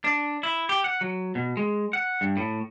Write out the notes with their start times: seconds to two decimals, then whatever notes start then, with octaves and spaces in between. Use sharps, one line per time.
0.04 D4
0.43 E4
0.69 G4
0.84 F#5
1.01 F#3
1.35 B2
1.57 G#3
1.93 F#5
2.21 G2
2.37 A2